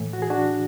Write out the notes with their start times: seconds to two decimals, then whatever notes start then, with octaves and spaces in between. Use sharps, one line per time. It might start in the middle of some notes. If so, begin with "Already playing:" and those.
Already playing: A2 E3
0.13 F#4
0.22 G#4
0.30 D4 F#4